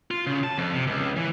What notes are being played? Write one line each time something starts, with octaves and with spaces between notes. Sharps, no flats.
F4
C#3
A5
F2
C3
C#2
E3